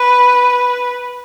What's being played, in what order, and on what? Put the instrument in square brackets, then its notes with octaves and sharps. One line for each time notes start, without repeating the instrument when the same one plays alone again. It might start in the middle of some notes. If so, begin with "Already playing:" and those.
Already playing: [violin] B4